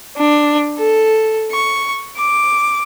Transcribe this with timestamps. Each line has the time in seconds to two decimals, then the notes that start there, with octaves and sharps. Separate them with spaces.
0.17 D4
0.78 A4
1.52 C#6
2.16 D6